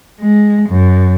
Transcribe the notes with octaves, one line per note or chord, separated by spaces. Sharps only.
G#3
F#2